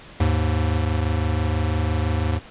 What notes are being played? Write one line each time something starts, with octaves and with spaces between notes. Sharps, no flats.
D#2 G#2